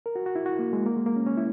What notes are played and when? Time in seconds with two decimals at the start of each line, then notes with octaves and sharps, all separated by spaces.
0.06 A#4
0.16 F#4
0.26 F#4
0.35 E4
0.46 F#4
0.59 A#3
0.73 G#3
0.86 A#3
0.96 G#3
1.06 A#3
1.16 C#4
1.27 C#4
1.37 E4